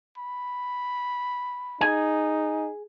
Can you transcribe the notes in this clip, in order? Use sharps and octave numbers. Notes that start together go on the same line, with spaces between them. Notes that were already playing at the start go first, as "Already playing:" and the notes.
B5
D#4 G#4 G#5